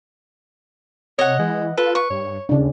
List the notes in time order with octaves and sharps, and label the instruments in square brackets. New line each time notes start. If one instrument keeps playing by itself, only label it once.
[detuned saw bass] C3 [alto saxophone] C#5 [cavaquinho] D#5 F#5
[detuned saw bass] E3 [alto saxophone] G#3
[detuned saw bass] F4 [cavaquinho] A4 [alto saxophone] B4
[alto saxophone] B4 [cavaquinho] C#6
[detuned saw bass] G2 [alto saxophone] C#5
[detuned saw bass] D#2 [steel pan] C#3 D4